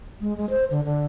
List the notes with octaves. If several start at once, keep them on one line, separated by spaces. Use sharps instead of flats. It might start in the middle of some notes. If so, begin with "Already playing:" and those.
G#3
G#3
C5
D3
D3